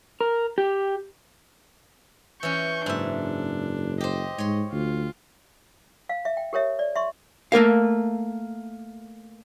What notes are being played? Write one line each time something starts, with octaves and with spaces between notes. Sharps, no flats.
A#4
G4
E3 C#4 C#6 G6
F#1 G#2 D4 E5
G4 C5 D#5
G#2 C#5 C6
D2 F4
F5
E5
G5
G4 A#4 C#5 E5
D5
E5 C6 C#6
A3 A#3 A#4 F5